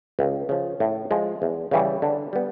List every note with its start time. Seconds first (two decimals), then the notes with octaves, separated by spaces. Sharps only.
0.19 C#2
0.49 C#3 F3
0.80 A2
1.11 F3 G#3
1.42 E2
1.71 C#3 E3 G3
2.02 D3
2.33 G3 B3